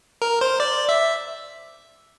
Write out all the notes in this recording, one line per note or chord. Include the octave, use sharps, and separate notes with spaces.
A#4
C5
D5
E5